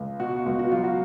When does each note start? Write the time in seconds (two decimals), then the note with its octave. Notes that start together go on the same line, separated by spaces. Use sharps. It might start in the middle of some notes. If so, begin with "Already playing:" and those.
Already playing: C#2
0.20 B2 F#4
0.46 C#2
0.59 F#4
0.72 F#3 F4
0.84 F#4